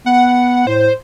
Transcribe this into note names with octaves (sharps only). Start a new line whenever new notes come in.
B3 F#5
A2 C5